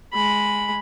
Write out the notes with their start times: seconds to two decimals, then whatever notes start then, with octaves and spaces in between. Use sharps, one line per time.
0.13 G#3 B5